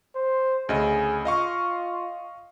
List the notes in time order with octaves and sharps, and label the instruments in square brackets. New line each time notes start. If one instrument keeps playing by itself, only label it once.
[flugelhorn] C5
[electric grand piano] D2 C#3 D#5 [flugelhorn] G#4
[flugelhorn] F4 [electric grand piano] D#5 F5 C#6